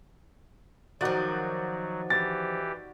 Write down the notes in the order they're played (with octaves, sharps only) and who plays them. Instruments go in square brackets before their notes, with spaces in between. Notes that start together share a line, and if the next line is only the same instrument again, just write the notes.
[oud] D#3 F3 [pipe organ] F#3 [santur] D#4 F#4 D5
[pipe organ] E3 G4 [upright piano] A6